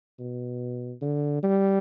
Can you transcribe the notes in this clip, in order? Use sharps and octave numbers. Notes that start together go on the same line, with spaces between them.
B2
D3
G3